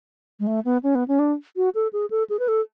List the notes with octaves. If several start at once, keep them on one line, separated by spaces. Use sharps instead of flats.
G#3
A3
B3
C#4
B3
C#4
D4
F#4
A4
G#4
A4
G#4
B4
A4